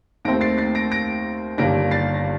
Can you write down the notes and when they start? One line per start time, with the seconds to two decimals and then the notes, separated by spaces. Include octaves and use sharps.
0.25 D#2 D#3 A3 C4 A#6 D7
0.41 A6 C7
0.58 A6 C7
0.75 A#6 D7
0.92 A#6 D7
1.58 G1 G2 D#3 A#3 D4 A#6 D7
1.91 A6 C7
2.14 A#6